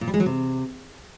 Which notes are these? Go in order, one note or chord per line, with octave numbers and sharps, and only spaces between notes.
A#2
G3
G#3
F#3
C3